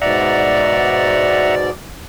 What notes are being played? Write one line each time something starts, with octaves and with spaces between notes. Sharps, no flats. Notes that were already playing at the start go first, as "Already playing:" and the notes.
G#2 B2 D5 E5 F#5 A#5